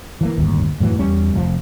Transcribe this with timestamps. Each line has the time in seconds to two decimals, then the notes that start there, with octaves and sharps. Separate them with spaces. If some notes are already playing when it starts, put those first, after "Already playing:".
0.21 E3 F3 A#3
0.38 D1 G1 D#2
0.80 F#2 A2 E3 F#3
0.99 E2 G3 C#4
1.34 F1 A#2 F3